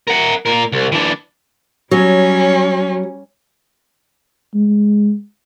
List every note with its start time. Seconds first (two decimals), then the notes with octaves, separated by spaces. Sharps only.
0.07 A#4 F#5
0.46 A#2 A#4
0.72 C2
0.92 E3 D4
1.91 F#3 G3 C#4
4.55 G#3